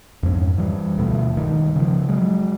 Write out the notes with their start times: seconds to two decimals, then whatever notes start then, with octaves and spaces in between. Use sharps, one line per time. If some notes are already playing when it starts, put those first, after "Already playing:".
0.23 F2 G#2 A#3 C#4
0.58 E3 G3
0.98 D2 B2 A3
1.37 G2 D#3
1.76 C#3 F3
2.09 F#3 G#3